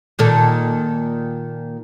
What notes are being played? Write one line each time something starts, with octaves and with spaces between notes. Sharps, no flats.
A#2 D#3 A4